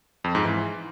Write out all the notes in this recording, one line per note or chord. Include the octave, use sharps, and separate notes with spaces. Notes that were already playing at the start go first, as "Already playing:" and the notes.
F2
G#2
E3